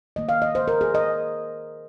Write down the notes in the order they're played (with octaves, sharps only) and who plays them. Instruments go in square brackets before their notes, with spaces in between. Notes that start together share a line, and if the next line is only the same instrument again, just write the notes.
[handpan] D#3 A#3 D#5
F5
D#5
C5
A#4
G#4
D#5